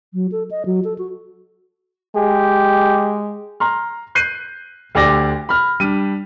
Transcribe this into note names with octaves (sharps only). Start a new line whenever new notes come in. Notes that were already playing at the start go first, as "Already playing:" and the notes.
F#3
A4
D#5
F#3
A4
F#4
G#3 G4
A#5 C6 F6
F#6 G6 C7 D#7
D2 D3 G4 D5 D6 A#6
B5 F6
G3 D4 D#7